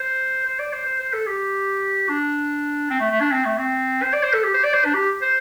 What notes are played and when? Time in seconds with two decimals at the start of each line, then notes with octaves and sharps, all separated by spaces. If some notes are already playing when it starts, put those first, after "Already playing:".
Already playing: C5
0.45 C5
0.59 D5
0.73 C5
0.86 C5
1.00 C5
1.13 A4
1.27 G4
2.09 D4
2.90 C4
3.00 A3
3.11 A3
3.21 D4
3.31 C4
3.45 A3
3.58 C4
4.03 C5
4.13 D5
4.23 C5
4.33 A4
4.44 G4
4.54 C5
4.64 D5
4.74 C5
4.85 D4
4.94 G4
5.22 C5